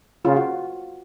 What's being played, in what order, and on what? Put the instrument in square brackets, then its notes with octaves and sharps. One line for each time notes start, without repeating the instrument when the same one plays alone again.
[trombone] C#3 [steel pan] F4
[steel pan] F#4